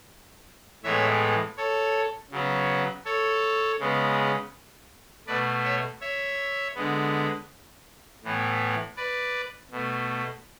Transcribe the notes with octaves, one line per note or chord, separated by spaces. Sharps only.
A2 E3 G#3 B3 C#5 E5
A4 C#5
C#3 F#3 B3
A4 C#5
C#3 G#3 B3
B2 A3 B4 D5
C#5 E5
C#5 E5
D3 G#3 B3
A2 E3 B3
B4 D5
B2 A3